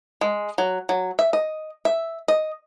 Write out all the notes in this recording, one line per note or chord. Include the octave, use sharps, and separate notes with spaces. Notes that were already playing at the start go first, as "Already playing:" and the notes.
G#3
F#3
F#3
E5
D#5
E5
D#5